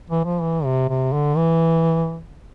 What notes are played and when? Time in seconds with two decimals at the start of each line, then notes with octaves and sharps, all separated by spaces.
0.10 E3
0.25 F3
0.42 E3
0.64 C3
0.89 C3
1.13 D3
1.36 E3